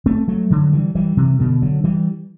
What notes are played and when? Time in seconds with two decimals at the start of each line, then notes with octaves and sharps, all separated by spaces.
0.06 A3 C4
0.28 F#3 A3
0.50 D3 F#3
0.73 E3 G3
0.95 E3 G3
1.17 C3 E3
1.40 B2 D3
1.62 D3 F#3
1.84 E3 G3